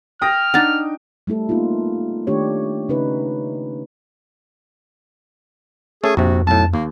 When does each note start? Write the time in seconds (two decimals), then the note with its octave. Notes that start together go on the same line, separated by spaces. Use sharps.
0.22 G5 D#6 F6 A#6
0.54 D4 D#4 F#5 A6
1.27 G3 A3 E4 A4
1.49 A#3 B3 D#4 F4
2.27 D#3 A3 D4 G4 C#5
2.89 C#3 C#4 D#4 E4 B4
6.04 A3 C#4 G#4 A4
6.17 A#1 F2 C3 F#4
6.47 B1 A2 A5
6.74 D#2 A#3